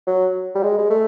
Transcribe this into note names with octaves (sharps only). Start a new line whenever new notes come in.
F#3
G3
G#3
G#3
A3